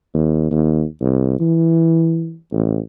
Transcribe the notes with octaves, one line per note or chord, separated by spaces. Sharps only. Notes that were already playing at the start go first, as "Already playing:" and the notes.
D#2
D#2
C2
E3
A1